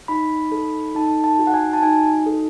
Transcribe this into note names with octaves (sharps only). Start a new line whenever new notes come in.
D#4 B5
A4
D#4 A5
A5
F#4
F#5
G#5
A5
D#4 G#5
A4